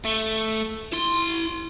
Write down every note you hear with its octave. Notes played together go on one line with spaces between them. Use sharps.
A3
E4 C6